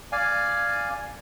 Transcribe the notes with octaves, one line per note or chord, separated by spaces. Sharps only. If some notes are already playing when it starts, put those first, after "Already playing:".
D5 F5 G#5